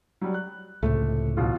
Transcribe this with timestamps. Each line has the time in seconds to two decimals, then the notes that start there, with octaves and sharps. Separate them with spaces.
0.21 F#3 G3
0.34 F#6
0.83 C#2 A2 C3 A3
1.37 A1 B2 F4